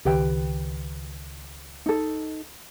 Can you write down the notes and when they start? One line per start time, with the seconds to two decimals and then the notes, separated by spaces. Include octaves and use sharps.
0.05 C#2 D#3 G4 B4 G5
1.86 D#4 A4